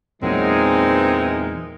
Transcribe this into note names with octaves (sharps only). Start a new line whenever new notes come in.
E2 A#2 E3 F#3 G#3 C4 D#4 A#4